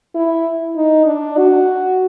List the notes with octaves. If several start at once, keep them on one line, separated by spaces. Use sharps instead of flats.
E4
D#4
D4
F#4